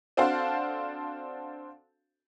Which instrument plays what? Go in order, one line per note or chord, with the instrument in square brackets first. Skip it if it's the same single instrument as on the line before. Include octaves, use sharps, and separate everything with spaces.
[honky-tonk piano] C4 D4 F#4 A4 C5 F5